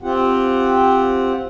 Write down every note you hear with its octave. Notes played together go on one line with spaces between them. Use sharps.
C4 F4 G4 F#5